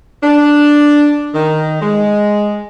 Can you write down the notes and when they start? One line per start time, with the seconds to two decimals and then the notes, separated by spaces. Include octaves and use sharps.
0.23 D4
1.34 D#3
1.81 G#3